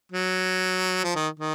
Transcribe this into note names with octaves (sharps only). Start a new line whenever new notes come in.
F#3
F3
D#3
D#3